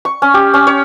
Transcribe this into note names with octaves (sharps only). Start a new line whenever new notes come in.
C#6
C#4
G4
C#4
C#5